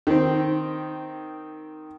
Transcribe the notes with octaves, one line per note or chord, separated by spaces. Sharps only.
D#3 C4